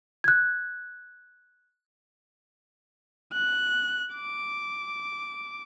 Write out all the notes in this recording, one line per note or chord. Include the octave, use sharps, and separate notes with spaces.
F#6 G#6
F#6
D6